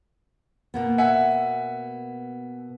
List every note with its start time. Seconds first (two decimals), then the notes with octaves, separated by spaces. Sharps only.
0.74 B2 A#3 B3
0.98 E5 F#5 G#5